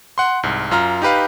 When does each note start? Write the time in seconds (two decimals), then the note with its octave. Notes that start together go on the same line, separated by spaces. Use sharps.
0.18 F#5 C6
0.43 C2 G#2
0.71 F#2 F4 A#5 F6
1.02 D#4 G4 B4 F5